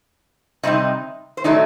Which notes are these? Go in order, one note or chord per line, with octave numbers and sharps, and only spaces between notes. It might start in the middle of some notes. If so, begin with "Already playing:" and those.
C3 G3 C4 D#4 D#5
C5
A2 F#3 A3 D#4 D5